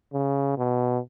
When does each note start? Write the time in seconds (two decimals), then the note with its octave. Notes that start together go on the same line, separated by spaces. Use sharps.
0.13 C#3
0.58 B2